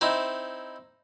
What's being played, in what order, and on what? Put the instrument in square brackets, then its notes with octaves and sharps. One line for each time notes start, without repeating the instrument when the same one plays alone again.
[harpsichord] C4 D#4 E4